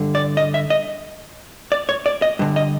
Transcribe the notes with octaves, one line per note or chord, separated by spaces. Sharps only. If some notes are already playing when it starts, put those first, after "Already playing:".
Already playing: G2 D3
D5
D#5
E5
D#5
D5
C#5
D5
D#5
G2 D3
D#5